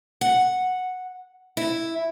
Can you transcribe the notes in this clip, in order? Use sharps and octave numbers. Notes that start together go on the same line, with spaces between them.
F#5
E4